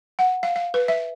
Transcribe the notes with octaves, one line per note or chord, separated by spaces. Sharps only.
F#5
F5
F5
B4
E5